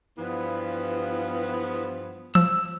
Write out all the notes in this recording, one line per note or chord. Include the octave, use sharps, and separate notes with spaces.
G2 E3 F3 B3
F3 E6